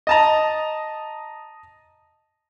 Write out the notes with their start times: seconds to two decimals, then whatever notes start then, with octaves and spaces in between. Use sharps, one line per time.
0.07 D#5 A5 A#5